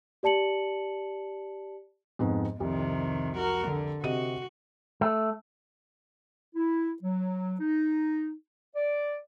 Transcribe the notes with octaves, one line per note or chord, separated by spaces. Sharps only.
G4 D5 A5 C#7 F#7
F2 G#2 B3
C2 F2 C3 D#3
F#4 A#4
D3
C3 F#4 D#5 D#7
A3
E4
F#3
D#4
D5